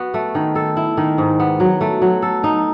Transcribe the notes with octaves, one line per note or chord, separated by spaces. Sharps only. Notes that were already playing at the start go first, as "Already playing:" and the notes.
Already playing: B3 F#4
A3
D#3
A4
E4
D#3
G#2
B3
F#3
A3
F#3
A4
D#4